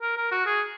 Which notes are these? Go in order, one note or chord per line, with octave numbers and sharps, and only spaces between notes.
A#4
A#4
F#4
G#4